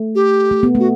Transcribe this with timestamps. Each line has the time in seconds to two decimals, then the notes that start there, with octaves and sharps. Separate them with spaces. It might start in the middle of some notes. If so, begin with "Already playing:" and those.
Already playing: A3
0.15 G4
0.51 A3
0.63 B3
0.75 A3 F#4